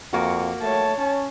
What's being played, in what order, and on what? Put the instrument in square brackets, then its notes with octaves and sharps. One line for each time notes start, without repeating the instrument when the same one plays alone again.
[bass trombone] F2 [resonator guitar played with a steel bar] A#3 F#4
[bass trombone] A3 [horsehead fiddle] C#5 A5
[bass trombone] C#4